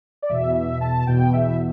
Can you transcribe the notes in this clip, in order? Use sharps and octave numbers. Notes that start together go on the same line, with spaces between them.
D5
E2 B2 E5
E5
A5
E2 B2 G5
E5